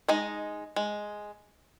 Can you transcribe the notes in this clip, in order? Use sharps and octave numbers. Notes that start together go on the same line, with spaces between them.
G#3 D#4 D#5
G#3